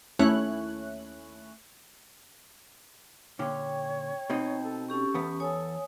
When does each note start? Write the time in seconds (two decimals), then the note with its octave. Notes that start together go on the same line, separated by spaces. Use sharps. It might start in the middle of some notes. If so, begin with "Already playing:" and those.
0.19 D#2 A3 C#4 E4 C#5 F#6
3.39 A#2 D3 C#4 C#5 G5
4.30 B2 C4 D#4
4.63 A4
4.89 C#4 G4 A4 C#6
5.14 E2 B3
5.40 A4 C#5 G#5 D#6